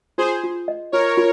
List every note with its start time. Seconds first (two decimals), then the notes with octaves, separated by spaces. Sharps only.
0.18 F4 G#4 C5
0.44 F4
0.68 D#5
0.92 F4 A#4 C#5
1.17 F4